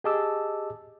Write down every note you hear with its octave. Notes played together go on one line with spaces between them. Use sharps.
G4 G#4 D#5 A5 D6 E6